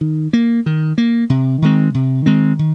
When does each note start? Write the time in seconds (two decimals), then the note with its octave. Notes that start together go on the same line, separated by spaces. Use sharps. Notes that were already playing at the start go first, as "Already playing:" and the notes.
0.01 D#3
0.33 A#3
0.66 D#3
0.98 A#3
1.30 C3
1.62 D#3 G#3 C4
1.95 C3
2.26 D#3 G#3 C4
2.59 D#3